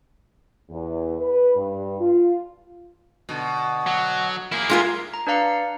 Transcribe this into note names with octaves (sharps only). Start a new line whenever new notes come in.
E2
B4
G2
F4
B2 D3
F#3
A#3 E4 G#4
G#3 F4 A#4
A#5
D4 B4 D5 F5 A#5 C#7